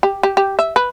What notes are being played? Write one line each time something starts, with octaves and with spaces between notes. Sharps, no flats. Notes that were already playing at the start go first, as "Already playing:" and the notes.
G4
G4
G4
E5
B4